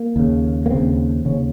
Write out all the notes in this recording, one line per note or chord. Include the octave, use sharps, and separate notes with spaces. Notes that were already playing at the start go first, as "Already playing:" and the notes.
Already playing: A#3
D#2 C#3
A#3
D#2 C#3 C4
D#2 C#3 C#4